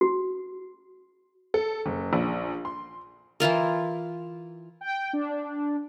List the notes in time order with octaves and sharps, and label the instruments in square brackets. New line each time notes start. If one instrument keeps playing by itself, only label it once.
[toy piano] F#4
[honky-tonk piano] A4
F#1
A#1
C6
[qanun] E3 E4 F4 A#4
[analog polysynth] G5
D4